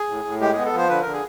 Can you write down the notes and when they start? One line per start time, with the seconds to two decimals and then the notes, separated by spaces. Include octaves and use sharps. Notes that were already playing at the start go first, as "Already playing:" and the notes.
Already playing: G#4
0.09 A2
0.25 A2
0.40 G#3 G4
0.53 B3 G#4
0.65 A4
0.73 F3 C5
0.89 D3 B4
1.02 D3 A#4
1.13 G#4